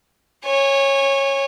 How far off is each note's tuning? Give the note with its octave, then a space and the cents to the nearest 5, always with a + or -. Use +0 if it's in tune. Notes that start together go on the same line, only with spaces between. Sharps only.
C#5 -15 G#5 -30